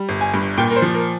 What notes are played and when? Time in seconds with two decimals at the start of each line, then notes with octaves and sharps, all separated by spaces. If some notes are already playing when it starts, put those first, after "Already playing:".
Already playing: G3
0.09 G1
0.21 G#5
0.34 G2
0.58 A#2 G5
0.71 A#4
0.76 C5
0.82 F3
0.94 A#4